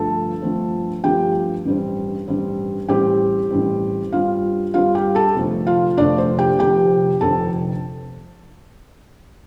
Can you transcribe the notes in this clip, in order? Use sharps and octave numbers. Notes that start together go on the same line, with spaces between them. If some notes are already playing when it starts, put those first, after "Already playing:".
Already playing: G2 D3 F3 A3 A4 A5
G2 F3 A3 C4
G2 F3 A3 C4 G4 G5
A1 G2 G3 C4
A1 G2 G3 C4
A1 A2 G3 C4 G4 G5
A1 A2 G3 C4
G2 G3 C4 F4 F5
G2 G3 C4 F4 F5
G4 G5
A4 A5
F1 F2 D3 A3
F4 F5
F1 F2 D3 A3 D4 D5
C5
G4 G5
F1 F2 D3 G4 G5
F1 F2 D3 A4 A5